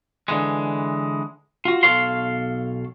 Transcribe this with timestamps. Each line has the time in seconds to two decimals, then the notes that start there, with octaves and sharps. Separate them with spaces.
0.28 D3 E3 G#3
1.65 F4 F#4
1.83 B1 A4 C#5 F5 C6